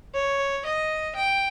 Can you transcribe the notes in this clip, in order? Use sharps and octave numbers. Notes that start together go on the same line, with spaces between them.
C#5
D#5
G5